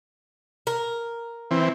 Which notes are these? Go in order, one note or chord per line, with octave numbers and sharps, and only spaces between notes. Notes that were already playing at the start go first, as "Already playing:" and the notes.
A#4
E3 C4